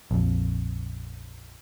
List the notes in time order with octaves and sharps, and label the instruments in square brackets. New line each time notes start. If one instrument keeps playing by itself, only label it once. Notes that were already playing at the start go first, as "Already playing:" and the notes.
[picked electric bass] A#1 F2